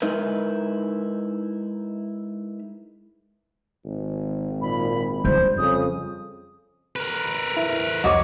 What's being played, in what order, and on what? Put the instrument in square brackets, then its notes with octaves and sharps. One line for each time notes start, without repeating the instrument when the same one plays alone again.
[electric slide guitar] G#3 D#4 E4 A#4 B4
[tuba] G#1
[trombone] A#2 [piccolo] B5
[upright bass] G3 [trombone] C5 [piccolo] G6
[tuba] F2 [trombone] C#3 [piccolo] D#6
[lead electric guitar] A#4 B4
[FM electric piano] E4
[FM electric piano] C2 F2 D#5 [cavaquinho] F#4 C#5 D6